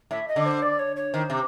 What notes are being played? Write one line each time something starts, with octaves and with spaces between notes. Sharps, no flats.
A2 E5
D#5
D3
C5
D5
C#5
C#5
D#3 C5
C3